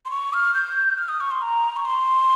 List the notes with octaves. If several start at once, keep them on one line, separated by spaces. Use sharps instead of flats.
C6
C#6
F6
G6
F6
D#6
C#6
C6
A#5
C#6
C6